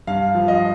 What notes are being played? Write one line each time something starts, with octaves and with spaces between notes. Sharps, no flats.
G2 F5
F3
D#5